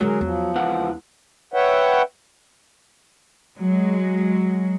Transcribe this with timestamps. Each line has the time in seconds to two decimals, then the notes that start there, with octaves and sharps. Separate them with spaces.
0.01 D3 F#3 G#3 G#4 A#4
0.21 E2 F3
0.55 C#2 E3 F#5
1.54 B4 C#5 E5 F#5 G5
3.58 F#3 G#3